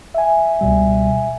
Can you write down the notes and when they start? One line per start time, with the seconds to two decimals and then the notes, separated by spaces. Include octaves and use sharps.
0.14 E5 G#5
0.61 C#2 B2 G3